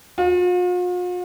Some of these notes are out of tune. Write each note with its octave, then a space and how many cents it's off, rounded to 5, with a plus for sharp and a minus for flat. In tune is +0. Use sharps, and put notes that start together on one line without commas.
F4 +45